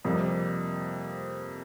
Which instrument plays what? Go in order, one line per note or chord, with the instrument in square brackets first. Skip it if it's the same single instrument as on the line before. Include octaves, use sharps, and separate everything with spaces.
[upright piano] F2 C3 G3 A#3